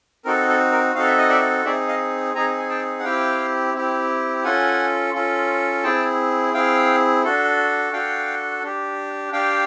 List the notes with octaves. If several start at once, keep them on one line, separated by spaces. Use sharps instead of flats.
C4 D#4 F#4 A4 A#4
A4
A#4
C4 D#4 F#4 A4 F5
E5
D#5
D5 E5
C4 D#4 G#4 D5 E5
D#5 F5
C4 D#4 G#4 G#5 A#5
G#5
G5 A5
F#5
C4 E4 G4 F5 G5
C4 E4 G4
C#4 F4 A4 F#5 G#5
C#4 F4 A4
C4 E4 G#4 G5 A5
C4 E4 G#4 F5 G5
D4 F#4 A4
D4 F#4 A4 F5 G5
D4 G4
D4 G4 F5 G5